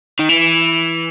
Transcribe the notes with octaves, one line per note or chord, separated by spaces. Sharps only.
D#3
E3